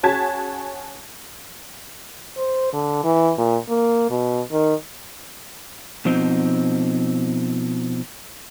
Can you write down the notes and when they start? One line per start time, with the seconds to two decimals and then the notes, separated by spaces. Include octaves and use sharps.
0.03 C#4 F#4 G#4 A5 G#6 B6
2.37 C5
2.73 D3
3.04 E3
3.38 A#2
3.69 A#3
4.10 B2
4.52 D#3
6.05 B2 F3 C4 D#4